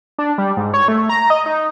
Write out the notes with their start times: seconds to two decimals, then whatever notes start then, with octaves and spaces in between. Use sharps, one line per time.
0.18 D4
0.38 G3
0.57 G#2
0.74 C#5
0.88 A3
1.09 A#5
1.30 D#5
1.46 D#4